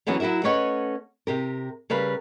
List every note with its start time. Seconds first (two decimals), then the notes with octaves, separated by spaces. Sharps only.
0.07 D3 E3 F#3 B3 C#4
0.20 F#3 E4 F#4 A#4 E5
0.43 A3 C#4 B4 C#5 D#5 F#5
1.27 C3 G4 A#4
1.90 C#3 G3 A#4 B4